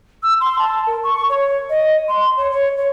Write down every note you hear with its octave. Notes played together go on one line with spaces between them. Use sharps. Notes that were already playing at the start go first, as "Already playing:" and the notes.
E6
C6
A5
A#4
C#6
C#5
D#5
C6
C#5
C#5
C#5